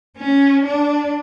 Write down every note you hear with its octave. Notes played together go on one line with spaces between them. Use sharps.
C#4
D4